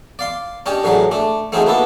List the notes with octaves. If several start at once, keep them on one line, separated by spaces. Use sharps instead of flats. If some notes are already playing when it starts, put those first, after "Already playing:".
D5 F5 C6
C#4 D4 G4 C#5 D#5
A2 D3 E3 F#3 G#4 A#5
A3 D4
A3 C4 C#4 D#4 F#4 G#4
A#3 B3 E4 F#4 A4 B4